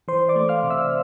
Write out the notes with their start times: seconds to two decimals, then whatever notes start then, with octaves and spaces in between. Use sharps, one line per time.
0.08 E3 C5 C6
0.29 D5 D6
0.36 A3
0.49 F5 F6
0.63 C3
0.70 E5 E6